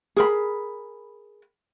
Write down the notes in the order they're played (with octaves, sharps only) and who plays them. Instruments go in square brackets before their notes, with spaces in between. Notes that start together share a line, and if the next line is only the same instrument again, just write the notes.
[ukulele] G#4 A#4 B5